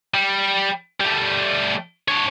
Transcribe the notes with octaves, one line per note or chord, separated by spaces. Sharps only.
G3
G3 A3
D4 C#5